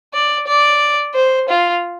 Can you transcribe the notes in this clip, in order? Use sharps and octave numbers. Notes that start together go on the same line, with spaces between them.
D5
D5
C5
F4